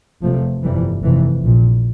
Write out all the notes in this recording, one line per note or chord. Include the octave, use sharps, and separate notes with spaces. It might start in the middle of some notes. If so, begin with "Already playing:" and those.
F1 E2 C3 F3 A3
G1 F2 C3 E3 G3
F1 F2 C3 E3
A#1 A#2